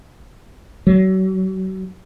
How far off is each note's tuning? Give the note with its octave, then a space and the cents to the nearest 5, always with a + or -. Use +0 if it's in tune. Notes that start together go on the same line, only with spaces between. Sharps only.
F#3 +35